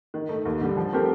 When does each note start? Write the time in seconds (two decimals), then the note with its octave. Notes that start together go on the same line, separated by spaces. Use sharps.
0.14 D#3
0.29 A3 D#4
0.45 D#2
0.61 D3 G3
0.77 F3
0.93 A3 C4 G4 A#4